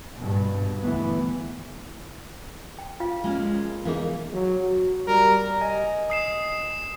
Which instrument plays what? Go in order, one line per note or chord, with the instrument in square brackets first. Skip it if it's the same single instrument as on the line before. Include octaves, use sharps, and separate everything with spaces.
[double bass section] G2 B2
D2 E3 B3
[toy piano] G5
F4 F5
[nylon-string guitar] G#3 A#3 C#4
[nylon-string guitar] E3 B3 D#4 [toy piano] G#4 A#4 F5
[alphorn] F#3
F#4
[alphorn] G3 [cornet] A#4
[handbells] D#5 G#5
[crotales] D#6 C7 E7